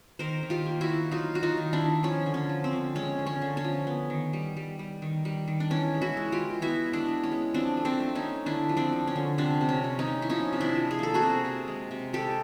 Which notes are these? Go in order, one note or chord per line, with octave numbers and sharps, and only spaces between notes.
D#3 A#4 C5
D#3
F4 G4
A#3
E4 F#4
D#3
F#3 D#4 F4
A#3 F#4
D#4 F4
D#3
D4 E4
D#3
F3 C#4
D3
C#4
F3
C4
D3
G#3 C#4
D3
C#4
D3
C#4
F3
B3
D#3
G3
G3
G3
D#3
G3
D#3
D4
E3 C#4
G#3
E4 F#4
G#3
F4 G4
E3
B3 E4 F#4
G#3
D4 E4
B3
C#4
G#3
F3 C4 D4
A3
C4 D4
A3
C#4 D#4
A3
D3 D4 E4
F3
C4 D4
D3
C#4
D3
C3 C4 D4
C3
C#4
C3
C#4 D#4
A#3
E4
F3 C#4 D#4
C3
D4 E4
F3
G#4
A#3 A4
F#4 G#4
C3
C3
G#3
C3
G#3 G4 A4